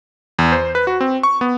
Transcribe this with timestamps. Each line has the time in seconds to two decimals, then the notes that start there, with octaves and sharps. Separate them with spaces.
0.39 E2
0.52 C5
0.75 B4
0.87 F#4
1.01 C4
1.23 C#6
1.41 B3